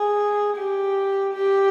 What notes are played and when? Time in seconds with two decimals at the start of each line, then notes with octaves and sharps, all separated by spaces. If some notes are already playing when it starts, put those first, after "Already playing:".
Already playing: G#4
0.58 G4
1.34 G4